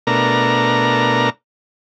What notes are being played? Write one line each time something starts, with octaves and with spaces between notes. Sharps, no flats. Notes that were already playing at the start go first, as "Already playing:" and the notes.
B2 A3 D4 A#4 A#5